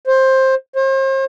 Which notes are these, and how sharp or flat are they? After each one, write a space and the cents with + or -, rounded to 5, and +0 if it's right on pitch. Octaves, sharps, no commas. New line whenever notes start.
C5 +15
C5 +40